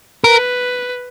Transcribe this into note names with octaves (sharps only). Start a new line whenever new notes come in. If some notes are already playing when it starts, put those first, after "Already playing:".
A#4 B4